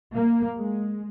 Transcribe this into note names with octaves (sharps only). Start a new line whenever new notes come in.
A#3
G#3